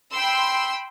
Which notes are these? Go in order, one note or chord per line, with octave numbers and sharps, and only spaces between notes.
G5 B5 C6 E6